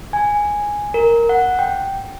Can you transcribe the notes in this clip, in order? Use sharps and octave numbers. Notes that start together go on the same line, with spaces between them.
G#5
A#4
F#5
G5